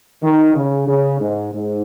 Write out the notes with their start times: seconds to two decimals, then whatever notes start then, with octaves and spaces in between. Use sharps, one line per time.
0.22 D#3
0.55 C#3
0.87 C#3
1.20 G#2
1.53 G#2